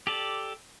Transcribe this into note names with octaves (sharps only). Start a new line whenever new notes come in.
G4 A4 D5